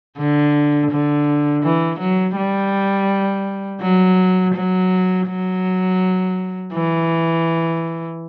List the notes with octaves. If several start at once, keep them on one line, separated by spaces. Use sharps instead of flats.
D3
D3
E3
F#3
G3
F#3
F#3
F#3
E3